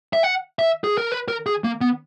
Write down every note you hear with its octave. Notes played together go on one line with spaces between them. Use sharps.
E5
F#5
E5
G#4
A#4
B4
A#4
G#4
A#3
B3